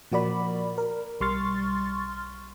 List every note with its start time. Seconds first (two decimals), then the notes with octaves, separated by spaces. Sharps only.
0.12 A#2 F3 F#4 A#4 D5 B5
0.78 A#4
1.21 B1 G3 C6 C#6 F6 A6